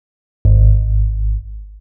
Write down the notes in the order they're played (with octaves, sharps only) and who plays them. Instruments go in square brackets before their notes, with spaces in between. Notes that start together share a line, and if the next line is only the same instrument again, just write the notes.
[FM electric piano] G#1